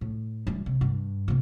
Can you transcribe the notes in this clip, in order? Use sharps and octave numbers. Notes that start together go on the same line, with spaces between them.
A2
E3 G3
C3
G2
C#2 C3